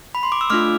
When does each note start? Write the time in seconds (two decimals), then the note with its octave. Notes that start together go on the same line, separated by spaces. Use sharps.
0.15 B5
0.23 C6
0.32 D6
0.41 E6
0.50 A3 D4 F4 D6 F6